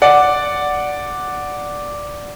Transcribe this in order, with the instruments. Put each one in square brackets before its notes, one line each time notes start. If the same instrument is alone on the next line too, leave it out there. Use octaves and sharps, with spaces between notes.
[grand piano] D5 F#5